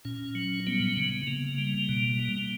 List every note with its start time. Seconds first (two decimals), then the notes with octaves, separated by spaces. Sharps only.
0.05 A#2 C#4
0.35 F#3
0.67 G3 B3
0.97 C#3
1.27 C#3 A#3
1.58 G3
1.89 B2
2.19 G3